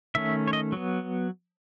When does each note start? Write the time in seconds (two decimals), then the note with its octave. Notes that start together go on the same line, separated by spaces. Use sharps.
0.15 D#3 A3 C#4 E5
0.47 C#5
0.53 D#5
0.72 F#3 B3